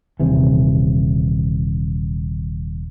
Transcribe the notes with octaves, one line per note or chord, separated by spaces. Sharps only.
D#1 C3 E3